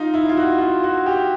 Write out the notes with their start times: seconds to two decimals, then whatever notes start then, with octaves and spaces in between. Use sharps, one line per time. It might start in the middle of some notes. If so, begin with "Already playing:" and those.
Already playing: D#4 F4
0.14 E4
0.29 F4
0.37 F#4
0.60 F4
0.83 F#4
1.06 G4